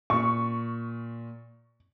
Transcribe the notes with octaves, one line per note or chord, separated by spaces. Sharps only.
A#2 C#6